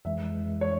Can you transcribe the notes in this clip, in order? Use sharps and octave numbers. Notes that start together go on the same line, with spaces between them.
F2 E3 G#3 E5
C#5